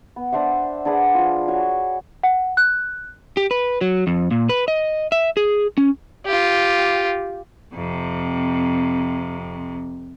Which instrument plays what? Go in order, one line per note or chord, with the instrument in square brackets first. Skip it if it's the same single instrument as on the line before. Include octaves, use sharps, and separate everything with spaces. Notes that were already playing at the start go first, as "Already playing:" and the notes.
[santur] B3
D4 C5 E5 F#5
D4 G#4 B4 F#5
F3 F4
F#4 C#5 G#5
[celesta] F#5
F#6
[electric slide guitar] G4
B4
F#3
F2
A#2
B4
D#5
E5
G#4
C#4
[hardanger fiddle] F4 G4
[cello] F2 C3